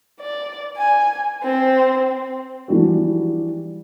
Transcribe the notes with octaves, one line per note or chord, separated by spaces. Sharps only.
D5
G#5
C4 C5
E3 F3 G3 D4 F#4